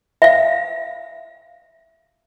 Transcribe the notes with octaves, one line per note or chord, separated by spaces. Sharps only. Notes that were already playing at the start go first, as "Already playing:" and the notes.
E5 F5